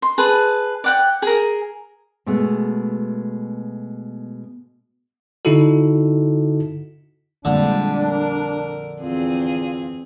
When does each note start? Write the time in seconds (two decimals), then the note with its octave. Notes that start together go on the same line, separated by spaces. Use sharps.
0.02 C6
0.18 G#4 B4 A5
0.84 D5 F#5 G5
1.22 G#4 A#4
2.26 B2 G#3 A3 B3
5.45 D3 D#4 E4 F#4 A4
7.45 F2 A#2 D3 F3 G3 G#3 D4
8.05 A#4
9.02 E2 C4 F4 G#4